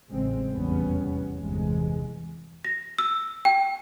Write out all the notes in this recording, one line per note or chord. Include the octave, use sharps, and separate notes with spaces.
A1 C#3 G#3 C4
F1 E2 G3 B3 C#4
G1 E2 C3 E3 G#3
A#6
E6
G5